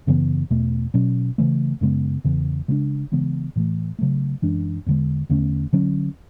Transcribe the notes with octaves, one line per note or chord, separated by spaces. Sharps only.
F#2 C#3 E3 B3
E2 B2 A3
B2 F#3 C#4
C#3 E3 A3
F#2 C#3 G#3 B3
E2 C#3 E3
C#3 G#3 B3 D4
C#3 E3 G#3 B3
A2 E3 A3
C#3 F#3 A3
F#2 E3 G#3 D4
E2 D3 G#3
E2 D3 A3 C#4
D3 F#3 C#4